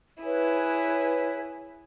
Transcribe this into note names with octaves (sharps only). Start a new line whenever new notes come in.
E4 G#4 B4 C#5